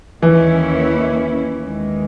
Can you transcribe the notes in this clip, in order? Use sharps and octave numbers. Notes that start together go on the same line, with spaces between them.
D#2 D#3 E3 A#3 C#4 E4
D#2 D#3 G#3